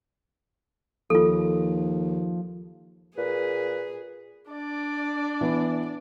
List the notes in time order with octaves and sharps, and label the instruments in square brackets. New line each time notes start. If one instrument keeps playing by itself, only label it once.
[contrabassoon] D#2 [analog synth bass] F3 [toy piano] F4 A4
[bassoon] A#2 [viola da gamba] G#4 [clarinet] B4
[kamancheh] D4 D5
[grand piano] E3 B3